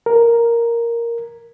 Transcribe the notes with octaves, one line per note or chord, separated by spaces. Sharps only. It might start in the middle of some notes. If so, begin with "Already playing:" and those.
A#4